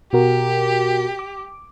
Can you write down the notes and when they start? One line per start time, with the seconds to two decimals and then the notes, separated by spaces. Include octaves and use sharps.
0.13 B2 F#4 G4 A#4
1.19 D6